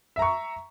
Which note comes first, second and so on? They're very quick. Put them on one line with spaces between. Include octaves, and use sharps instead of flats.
E5 A#5 C#6